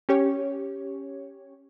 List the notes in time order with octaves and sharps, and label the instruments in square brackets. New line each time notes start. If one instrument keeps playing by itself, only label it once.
[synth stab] C#4 G4 C#5